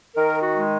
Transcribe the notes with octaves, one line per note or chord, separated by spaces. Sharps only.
D#3 A#4
F#4
G#3